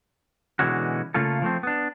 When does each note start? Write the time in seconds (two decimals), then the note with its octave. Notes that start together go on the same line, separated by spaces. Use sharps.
0.59 B2 D3 E3 G#3 C#4 F#4
1.14 C#3 A3 A#3 F4 A4
1.42 F3 A3 C4
1.63 B3 D4